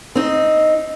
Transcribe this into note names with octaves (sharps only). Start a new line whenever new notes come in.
C4 D#4